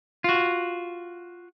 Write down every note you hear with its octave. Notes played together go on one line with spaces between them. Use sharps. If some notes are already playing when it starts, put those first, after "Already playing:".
F4 F#4